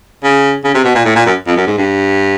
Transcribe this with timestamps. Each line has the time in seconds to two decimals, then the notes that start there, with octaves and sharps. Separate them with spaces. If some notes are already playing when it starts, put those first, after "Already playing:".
0.23 C#3
0.64 C#3
0.74 C3
0.85 B2
0.95 A#2
1.05 A2
1.15 A#2
1.26 F#2
1.47 F2
1.57 F#2
1.67 G#2
1.78 G2